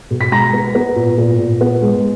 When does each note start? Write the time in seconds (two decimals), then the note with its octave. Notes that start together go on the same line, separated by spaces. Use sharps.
0.11 B2
0.21 B6
0.31 G#3 A#5 A#6
0.53 B3
0.75 B3
0.96 A#2
1.17 A#2
1.39 A#2
1.61 B3
1.82 G#3